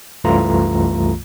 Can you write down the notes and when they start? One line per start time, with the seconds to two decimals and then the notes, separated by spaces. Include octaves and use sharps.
0.24 C2 F#2 E3 A3 F4 A#5